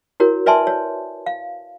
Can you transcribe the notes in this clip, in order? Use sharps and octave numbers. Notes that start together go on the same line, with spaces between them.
E4 F#4 A#4 C#5
B4 D5 E5 G#5 A5 C6
C#5
F5